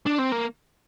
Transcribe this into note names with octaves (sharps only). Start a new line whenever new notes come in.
D4
C4
A#3